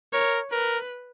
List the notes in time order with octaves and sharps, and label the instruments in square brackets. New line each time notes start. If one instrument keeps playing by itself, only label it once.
[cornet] A#4 [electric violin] C#5
[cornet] A#4 [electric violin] B4